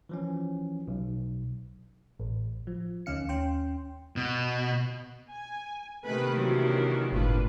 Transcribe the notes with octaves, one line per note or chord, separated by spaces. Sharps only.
E3 F3 C#4
B1
A1
F3
D2 D#3 C#4 F5 C#7
D#2 C#4 G5 C6
B2
G#5
C3 D#3 A3 A#3 B4
E3 F#3 D4
G1 A2 D4 F4 B4